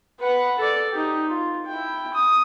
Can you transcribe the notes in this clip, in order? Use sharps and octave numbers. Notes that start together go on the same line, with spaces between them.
B4 F#5
A4 D5
D#4 G4
F4
E4 G5
D#6